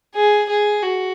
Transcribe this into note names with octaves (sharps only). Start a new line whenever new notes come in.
G#4
G#4
F#4